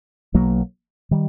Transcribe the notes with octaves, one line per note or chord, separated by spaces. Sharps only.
B1 B2 F#3 A#3
D#3 G3